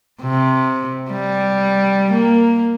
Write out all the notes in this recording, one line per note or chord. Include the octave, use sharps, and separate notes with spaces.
C3
G3
A#3